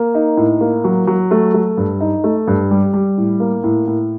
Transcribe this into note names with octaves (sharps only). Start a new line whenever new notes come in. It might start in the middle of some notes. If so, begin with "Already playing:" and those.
Already playing: A#3
D#4
A2
A#3
F#3
F#3
A3
A3
G2
D#4
A3
G2
G3
G3
A2
A#3
A2
A2